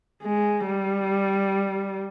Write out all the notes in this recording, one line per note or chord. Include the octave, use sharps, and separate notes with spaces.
G#3
G3